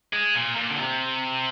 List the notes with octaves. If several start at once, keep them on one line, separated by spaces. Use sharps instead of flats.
G#3
A#2
A#2
D3
C3